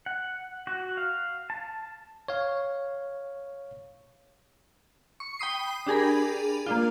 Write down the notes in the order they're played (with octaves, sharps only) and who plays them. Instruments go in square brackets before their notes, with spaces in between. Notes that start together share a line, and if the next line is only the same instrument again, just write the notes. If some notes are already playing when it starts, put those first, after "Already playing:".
[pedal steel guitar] F#5
F#4
F5
A5
[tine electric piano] C#5 F5
[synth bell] C#6
G5 B5 D#6 C7
D4 G4 G#4 A#4 B5
A#3 D4 F4